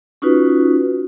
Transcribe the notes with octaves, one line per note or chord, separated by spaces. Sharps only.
C#4 D#4 F4 F#4 B4